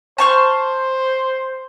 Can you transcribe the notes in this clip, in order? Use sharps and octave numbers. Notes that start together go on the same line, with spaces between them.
C5 A5 C#6 F6